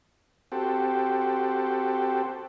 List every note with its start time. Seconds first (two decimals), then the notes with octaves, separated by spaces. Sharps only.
0.52 C4 F#4 G4 A4